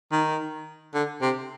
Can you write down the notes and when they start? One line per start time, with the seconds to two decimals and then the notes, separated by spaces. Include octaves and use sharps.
0.12 D#3
0.94 D3
1.22 C3